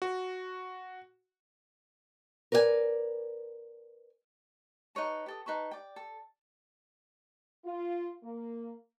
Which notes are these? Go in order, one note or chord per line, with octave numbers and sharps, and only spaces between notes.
F#4
A#4 B4 D5 D#5 G#5
D#4 B4 C#5 A5
G4 A4 D#6
D#4 B4 A5 C#6
D5 G5
A4
F4
A#3